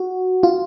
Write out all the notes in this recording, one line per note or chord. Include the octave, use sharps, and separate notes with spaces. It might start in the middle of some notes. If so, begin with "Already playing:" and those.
Already playing: F#4
F4